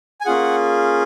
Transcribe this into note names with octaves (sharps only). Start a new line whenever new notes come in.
G#5
A#3 C#4 F4 G#4 F#5